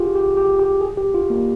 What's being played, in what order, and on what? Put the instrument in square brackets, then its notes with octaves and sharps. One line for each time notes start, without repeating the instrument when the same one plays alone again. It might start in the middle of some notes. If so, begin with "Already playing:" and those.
Already playing: [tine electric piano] F4 G4 G#4
G4
G4
G4
G#4
G4
F4
A#3